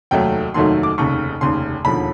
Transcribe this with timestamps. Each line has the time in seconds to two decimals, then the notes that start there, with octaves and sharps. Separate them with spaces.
0.11 F1 D#2 D#3 F#3 A3 G5
0.54 F1 D#2 D#3 F#3 A3 C6
0.83 D6
0.98 F1 D#2 C#3 C#6
1.41 F1 D#2 C#3 C6
1.85 E1 D#2 D3 F3 B5